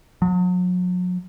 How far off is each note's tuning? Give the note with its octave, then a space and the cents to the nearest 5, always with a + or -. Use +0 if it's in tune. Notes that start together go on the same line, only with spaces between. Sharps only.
F#3 -40